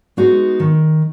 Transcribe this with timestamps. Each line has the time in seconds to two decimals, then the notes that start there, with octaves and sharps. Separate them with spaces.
0.17 G#3 B3 D#4 F#4
0.60 D#3